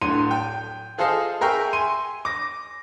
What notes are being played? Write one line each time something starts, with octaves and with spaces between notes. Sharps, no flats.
D1 D3 C6 D#7
G5
F4 G#4 A4 C5 D#5 F5
G#4 A#4 E5 G5 C#6
G#5 C6 D#7
D6 A#6